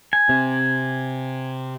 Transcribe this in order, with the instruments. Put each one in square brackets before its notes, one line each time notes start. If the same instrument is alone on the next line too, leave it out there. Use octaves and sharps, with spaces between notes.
[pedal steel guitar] G#5
[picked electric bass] C3